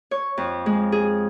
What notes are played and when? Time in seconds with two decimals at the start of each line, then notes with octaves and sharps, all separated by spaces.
0.11 C#5
0.37 F2
0.66 G#3
0.92 G#4